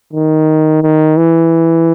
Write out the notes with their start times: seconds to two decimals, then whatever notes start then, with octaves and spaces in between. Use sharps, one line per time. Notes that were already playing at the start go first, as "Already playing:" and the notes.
0.13 D#3
0.82 D#3
1.17 E3